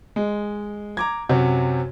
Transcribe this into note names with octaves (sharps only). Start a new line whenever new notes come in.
G#3
A#5 D6 G#6
F#2 C3 F#3